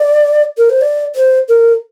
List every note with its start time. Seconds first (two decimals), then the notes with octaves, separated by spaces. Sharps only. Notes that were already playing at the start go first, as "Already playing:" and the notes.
Already playing: D5
0.58 A#4
0.70 C5
0.81 D5
1.15 C5
1.48 A#4